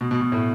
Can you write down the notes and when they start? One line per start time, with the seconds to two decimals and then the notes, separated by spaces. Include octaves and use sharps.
0.01 B2
0.11 B2
0.21 B2
0.32 A2